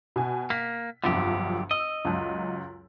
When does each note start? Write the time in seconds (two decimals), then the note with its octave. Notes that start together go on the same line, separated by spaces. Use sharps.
0.16 B2 G#5
0.50 A#3 B6
1.04 G1 C2 F2 D3 F#3 G4
1.71 D#5 E6
2.05 C#2 F#2